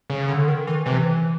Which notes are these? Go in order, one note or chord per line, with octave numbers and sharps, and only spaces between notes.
C#3
D3
D#3
E3
C3 E3